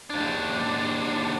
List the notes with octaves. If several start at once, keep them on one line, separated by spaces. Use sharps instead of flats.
D#2 D4